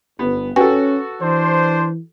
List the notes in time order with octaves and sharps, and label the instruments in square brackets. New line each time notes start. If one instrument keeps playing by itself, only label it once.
[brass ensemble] G1 [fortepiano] B3
[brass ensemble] C#4 [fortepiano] F#4 A4 [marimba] B4 G5 G#5
[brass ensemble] E3 [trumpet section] D4 C5